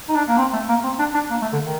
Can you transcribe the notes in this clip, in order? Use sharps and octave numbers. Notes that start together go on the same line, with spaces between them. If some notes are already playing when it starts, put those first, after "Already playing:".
D#4
D4
A#3
C4
A3
A#3
C4
D4
D4
A#3
A3
D3
D#3